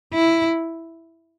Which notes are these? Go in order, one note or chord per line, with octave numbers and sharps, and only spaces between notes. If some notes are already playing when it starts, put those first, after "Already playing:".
E4